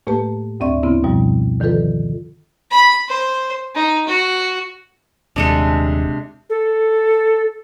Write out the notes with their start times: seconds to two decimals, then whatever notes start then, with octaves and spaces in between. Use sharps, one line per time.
0.07 A2 A3 A#3 G4 B4 A5
0.60 D2 G2 C4 D5 E5 C#6
0.83 C#3 B3 C4 E4
1.04 F#2 B2 F3 G3
1.60 D3 D#3 F3 F4 A4 B4
2.71 B5
3.08 C5
3.75 D#4
4.07 F#4
5.36 D#1 C3 G#3 D4 A4
6.50 A4